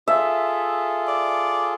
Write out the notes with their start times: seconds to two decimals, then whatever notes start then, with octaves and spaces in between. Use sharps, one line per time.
0.08 F4 G#4 A4 E5
1.07 D5